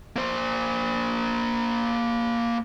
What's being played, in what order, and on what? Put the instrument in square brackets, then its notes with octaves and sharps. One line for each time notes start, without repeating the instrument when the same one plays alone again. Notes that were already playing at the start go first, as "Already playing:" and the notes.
[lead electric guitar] A#3 C5